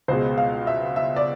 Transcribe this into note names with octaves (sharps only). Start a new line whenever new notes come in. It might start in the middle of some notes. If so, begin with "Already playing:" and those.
C#2 B2 G#3 C5
F5
E5
E5
D5